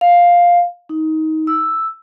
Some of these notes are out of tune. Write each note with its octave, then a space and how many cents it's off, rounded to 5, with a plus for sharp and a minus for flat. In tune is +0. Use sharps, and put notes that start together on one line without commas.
F5 +5
D#4 +20
E6 +0